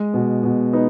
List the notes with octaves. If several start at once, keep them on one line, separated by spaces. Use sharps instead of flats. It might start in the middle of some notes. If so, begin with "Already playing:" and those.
Already playing: G#3
B2
B2
B3 D#4